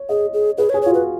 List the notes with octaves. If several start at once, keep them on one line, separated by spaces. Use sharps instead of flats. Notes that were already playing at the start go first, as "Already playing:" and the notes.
Already playing: C#5
G#4 D#5
G#4
G#4 B4
C#5
G#4
C#5
F4
F#4
B4